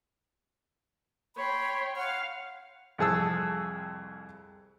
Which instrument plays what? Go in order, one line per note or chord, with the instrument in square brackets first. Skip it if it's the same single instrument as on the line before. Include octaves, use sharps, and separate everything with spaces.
[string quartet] C#5 G5 C6 [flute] B5
[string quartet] F5 F6 [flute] F#5
[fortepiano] C2 F2 G#4 A5 E6